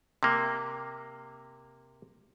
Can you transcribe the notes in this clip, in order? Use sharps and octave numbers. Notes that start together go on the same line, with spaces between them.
C3 A#3